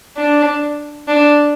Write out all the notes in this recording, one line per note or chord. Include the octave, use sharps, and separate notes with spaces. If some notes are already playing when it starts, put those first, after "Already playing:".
D4
D4